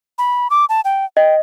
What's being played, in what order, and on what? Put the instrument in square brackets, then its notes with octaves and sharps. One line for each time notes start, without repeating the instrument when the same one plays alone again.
[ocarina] B5
D6
A5
G5
[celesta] D#5 [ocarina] G5